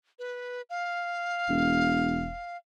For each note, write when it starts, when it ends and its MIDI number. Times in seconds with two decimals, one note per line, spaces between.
0.19 0.62 71
0.70 2.57 77
1.49 2.37 28